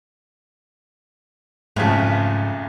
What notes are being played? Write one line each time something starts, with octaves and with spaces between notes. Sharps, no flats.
B1 F2 G#2 C#3 A3 B4